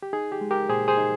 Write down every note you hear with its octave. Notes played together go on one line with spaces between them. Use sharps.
G4
D#4 G#4
G4
G#3
G4 A#4
A#2 G#4 C5
G#4 C5
D#4